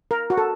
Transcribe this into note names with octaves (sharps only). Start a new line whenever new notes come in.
A#4
F#4
A4